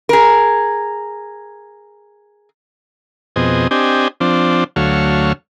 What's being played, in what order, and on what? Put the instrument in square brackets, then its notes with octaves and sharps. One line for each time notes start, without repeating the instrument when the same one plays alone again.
[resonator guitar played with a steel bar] G#4 A#4
[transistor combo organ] F2 B2 C4 G#4 D#5
C4 D4 G4 D#5 G#5
F3 C4 D4
D2 F#3 A3 C#5 F5